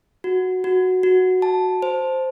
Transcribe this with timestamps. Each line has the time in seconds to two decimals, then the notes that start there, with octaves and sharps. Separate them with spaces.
0.24 F#4
0.64 F#4
1.03 F#4
1.42 A5
1.82 C5